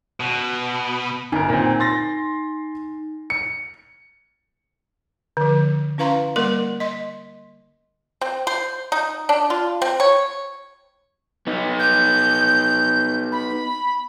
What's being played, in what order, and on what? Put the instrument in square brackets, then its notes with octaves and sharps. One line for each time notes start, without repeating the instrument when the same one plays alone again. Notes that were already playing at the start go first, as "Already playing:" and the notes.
[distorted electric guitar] B2
[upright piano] G1 A#4 [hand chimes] D#4 G#5
[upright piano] A#2 C4
C6 A6 A#6
C#7
[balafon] D3 F3
C#4 E4 B4 F5 A#5 C6
G3 A#3 A#4 D#5 F#5 C6
D#5 C6
[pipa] C4
C5
D#4
D4
F4
C4
C#5
[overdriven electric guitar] B3 D#4
[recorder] G6
B5